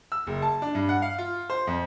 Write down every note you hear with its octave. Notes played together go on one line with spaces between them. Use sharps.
E6
F#1
A5
D4
G2
F#5
F5
F4
C5
F2